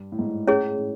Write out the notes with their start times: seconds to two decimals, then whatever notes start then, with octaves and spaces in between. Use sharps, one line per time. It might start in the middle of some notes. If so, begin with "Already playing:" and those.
Already playing: G2
0.12 A2
0.19 G#2
0.27 A2
0.48 C#4 E4 G#4 C#5
0.79 A2